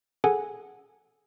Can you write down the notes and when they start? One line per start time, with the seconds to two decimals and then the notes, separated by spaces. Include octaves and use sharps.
0.24 G#4 A4 F#5 G#5